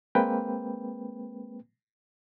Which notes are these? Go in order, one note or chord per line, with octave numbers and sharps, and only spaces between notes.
G#3 A#3 C4 B4 G5